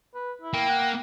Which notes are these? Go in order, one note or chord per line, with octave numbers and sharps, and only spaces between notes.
B4
E4
A#3 G5
F#5